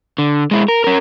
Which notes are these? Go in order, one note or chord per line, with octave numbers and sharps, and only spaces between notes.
D3
G#3 E4
A#4
C#4 A#4